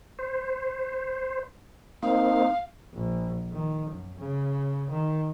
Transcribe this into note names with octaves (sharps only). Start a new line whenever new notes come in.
C5
A#3 C4 D#4 F5
A#1
D#3
F#2
C#3
D#3